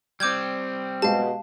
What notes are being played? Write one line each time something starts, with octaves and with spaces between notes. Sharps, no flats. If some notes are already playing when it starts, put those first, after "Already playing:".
G3 C4 D6 G6 G#6
B2 G#3 G4 F5 A5